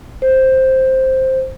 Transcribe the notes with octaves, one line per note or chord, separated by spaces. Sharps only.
C5